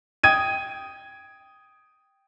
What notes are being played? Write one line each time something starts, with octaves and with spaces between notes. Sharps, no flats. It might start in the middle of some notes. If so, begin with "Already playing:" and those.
G5 D#6 G#6 D#7